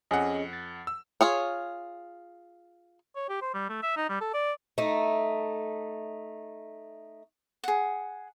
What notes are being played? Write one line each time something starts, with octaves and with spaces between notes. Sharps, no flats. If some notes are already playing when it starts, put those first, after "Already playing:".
F2 C#4 G#4 D#5 F#5
A6
E6
F4 G#4 C#5
C#5
G4
C5
G3
A3
E5
D#4
G3
A4
D5
A3 D#4
G#4 F#5